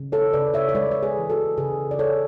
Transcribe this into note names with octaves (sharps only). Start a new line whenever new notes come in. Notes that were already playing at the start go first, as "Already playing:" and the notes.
Already playing: C#3
A4 C#5
C#3 B4 D5
C#5 E5
C#5
G#3 B4 D5
C#5
G#4 B4
E3
F#4 A4
C#3 G#4 B4
D5
C#3 A4 C#5